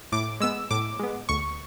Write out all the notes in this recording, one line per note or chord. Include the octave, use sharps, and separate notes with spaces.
A2 D6
G#3 B3 E6
A2 D6
G#3 B3
D2 C#6